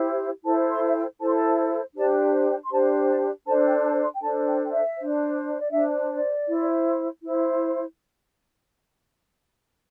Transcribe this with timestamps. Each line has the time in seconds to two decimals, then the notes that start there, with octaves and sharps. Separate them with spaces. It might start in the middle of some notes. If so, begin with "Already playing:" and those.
Already playing: E4 G4 C5
0.45 E4 A4 C5 A5
0.70 C6
0.86 E5
0.96 G5
1.20 E4 A4 C5 A5
1.27 C6
1.34 A5
1.96 D4 G4 C5 A5
2.46 G5
2.63 C6
2.71 D4 G4 C5 A5
3.08 A5
3.46 D4 A4 C5 A5
3.66 G5
3.84 A5
4.03 C6
4.13 G5
4.21 D4 A4 C5 A5
4.46 G5
4.65 G5
4.71 E5
4.97 D4 C5
5.61 D5
5.72 D4 C5 E5
6.09 D5
6.47 E4 C5
7.22 E4 C5